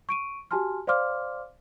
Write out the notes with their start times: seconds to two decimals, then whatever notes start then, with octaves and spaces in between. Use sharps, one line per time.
0.09 C#6 D7 D#7
0.51 F#4 G4 G#5 A5 C6 F6
0.87 C5 D5 F5 C6 D6 F6